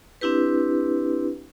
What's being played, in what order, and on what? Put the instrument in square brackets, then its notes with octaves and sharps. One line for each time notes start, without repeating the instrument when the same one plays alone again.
[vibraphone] C4 D4 E4 G4 B4